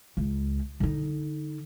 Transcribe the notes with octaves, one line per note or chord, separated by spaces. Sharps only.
C#2
D3 D#4